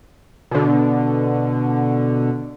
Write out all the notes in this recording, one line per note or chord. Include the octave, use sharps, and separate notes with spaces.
B2 D3